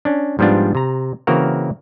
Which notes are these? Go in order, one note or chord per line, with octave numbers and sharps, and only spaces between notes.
C#4 D4
G#2 F3 G3 B3 D4 F4
C3 A#5
C#3 E3 A#3 C4 F#4 A#4